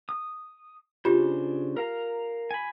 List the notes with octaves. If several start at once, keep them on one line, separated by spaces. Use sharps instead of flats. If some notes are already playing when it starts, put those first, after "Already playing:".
D#6
C#3 D4 F4 G4 C5
A#4 F5 A#5
G#5 B5